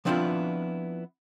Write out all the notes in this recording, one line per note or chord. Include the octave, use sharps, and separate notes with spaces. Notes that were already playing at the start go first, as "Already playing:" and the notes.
F3 B3 C4 D4 E4 F4